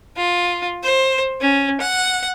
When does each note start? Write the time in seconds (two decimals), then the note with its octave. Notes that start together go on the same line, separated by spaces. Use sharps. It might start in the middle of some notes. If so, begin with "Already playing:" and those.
0.16 F4
0.83 C5
1.40 C#4
1.80 F#5